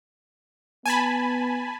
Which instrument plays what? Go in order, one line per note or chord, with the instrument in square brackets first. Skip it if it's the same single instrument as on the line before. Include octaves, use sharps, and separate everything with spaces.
[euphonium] B3 [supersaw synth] G#5 A5 B5